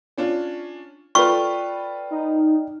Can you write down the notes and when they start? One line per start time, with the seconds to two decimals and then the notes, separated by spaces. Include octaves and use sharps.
0.18 C#4 D4 F4
1.15 F4 A4 B4 D5 G5 C#6 F6
2.11 D#4